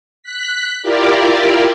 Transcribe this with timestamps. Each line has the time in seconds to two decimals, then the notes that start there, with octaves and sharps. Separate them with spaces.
0.23 F#6 B6
0.82 E4 F4 G4 A#4 D5